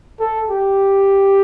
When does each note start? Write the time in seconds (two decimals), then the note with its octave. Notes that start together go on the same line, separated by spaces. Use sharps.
0.20 A4
0.50 G4